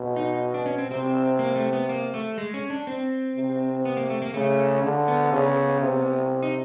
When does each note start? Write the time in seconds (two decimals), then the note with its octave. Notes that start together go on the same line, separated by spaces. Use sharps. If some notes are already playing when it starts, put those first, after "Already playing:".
Already playing: B2
0.16 D#4
0.54 D4
0.66 C#4
0.78 C4
0.90 C3 C4
1.39 A#3
1.56 A3
1.73 B3
1.89 A#3
2.14 A3
2.38 G#3
2.54 C#4
2.70 D4
2.87 C4
3.36 C3
3.85 B3
3.97 A#3
4.10 A3
4.22 A#3
4.34 C#3 A3
4.83 D3
5.08 B3
5.32 C#3
5.81 C3
6.43 D#4